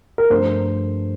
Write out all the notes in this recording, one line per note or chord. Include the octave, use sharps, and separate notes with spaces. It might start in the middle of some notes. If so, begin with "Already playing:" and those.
A#4
G2 F3 A3 C5